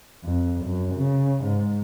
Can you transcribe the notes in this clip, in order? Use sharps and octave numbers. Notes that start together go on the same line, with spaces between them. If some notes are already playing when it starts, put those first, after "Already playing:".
F2
F#2
C#3
G#2